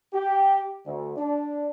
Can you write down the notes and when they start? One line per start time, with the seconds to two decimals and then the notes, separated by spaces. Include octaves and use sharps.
0.14 G4
0.86 D2
1.17 D4